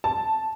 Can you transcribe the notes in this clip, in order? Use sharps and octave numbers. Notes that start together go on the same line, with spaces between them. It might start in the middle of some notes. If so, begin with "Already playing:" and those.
A5